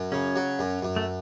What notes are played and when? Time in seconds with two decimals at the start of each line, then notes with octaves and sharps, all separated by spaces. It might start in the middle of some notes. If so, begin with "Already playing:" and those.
Already playing: F#2
0.12 C#3 C#4
0.36 F#3
0.59 F#2
0.82 F#2
0.96 A3